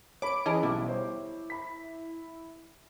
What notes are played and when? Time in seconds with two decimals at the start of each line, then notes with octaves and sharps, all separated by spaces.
0.22 C#5 B5 D6 D7
0.46 E3 C#4 G#4 D#5 A5 B5
0.63 B1 G3 E4 D6
0.89 C5 C#5
1.50 B5 B6